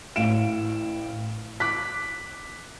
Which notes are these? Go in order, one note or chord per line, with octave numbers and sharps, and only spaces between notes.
A1 A2 F5 D7 E7
D6 F#6 B6